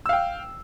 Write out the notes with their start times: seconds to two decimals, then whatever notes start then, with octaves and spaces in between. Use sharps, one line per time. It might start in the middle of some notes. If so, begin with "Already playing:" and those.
0.06 E6
0.09 F5
0.13 G5